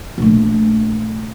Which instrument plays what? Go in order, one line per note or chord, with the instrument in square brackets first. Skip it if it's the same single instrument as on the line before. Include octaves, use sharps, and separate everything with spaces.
[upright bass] A#1 A3